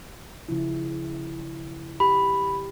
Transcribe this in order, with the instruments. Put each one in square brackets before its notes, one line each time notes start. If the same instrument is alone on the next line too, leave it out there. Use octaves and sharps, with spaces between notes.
[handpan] C#3 F3 E4
[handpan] G4 [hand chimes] B5